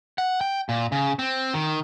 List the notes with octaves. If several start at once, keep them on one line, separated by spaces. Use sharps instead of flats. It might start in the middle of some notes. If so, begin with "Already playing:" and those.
F#5
G5
A#2
C#3
C4
D#3